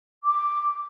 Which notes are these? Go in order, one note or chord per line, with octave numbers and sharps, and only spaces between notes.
D6